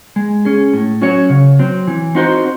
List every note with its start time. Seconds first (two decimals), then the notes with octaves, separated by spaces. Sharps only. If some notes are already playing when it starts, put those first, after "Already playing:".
0.16 G#3
0.45 C#4 G#4
0.73 A2
1.02 F#3 C#4 F#4 C#5
1.30 C#3
1.59 F#3 C4
1.87 E3
2.15 C4 D#4 F#4 C5